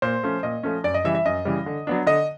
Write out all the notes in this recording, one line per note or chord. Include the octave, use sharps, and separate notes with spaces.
A#2 C5
F3 A3 C#4
A#2 D#5
F3 A3 C#4
F#2 D5
D#5
C#3 E3 G3 E5
E5
F#2 D#5
C#3 E3 G3
D3
F#3 B3 D4
D3 D#5